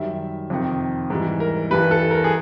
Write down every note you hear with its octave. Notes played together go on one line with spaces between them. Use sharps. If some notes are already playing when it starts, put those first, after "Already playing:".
Already playing: F#2 D#3 G3 E5
F2 C3 D#3
G#2 E3 G3
A#4
G2 E3 G3 B4
A4
A#4
G#4